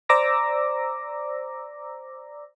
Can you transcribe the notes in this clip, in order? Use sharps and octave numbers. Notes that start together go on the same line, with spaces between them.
C5 D5 A#5 D6 E6 A#6